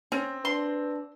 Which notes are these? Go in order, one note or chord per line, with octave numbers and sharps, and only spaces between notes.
C4 C#4
D4 B4 C6